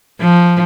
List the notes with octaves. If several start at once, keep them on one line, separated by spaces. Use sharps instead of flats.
F3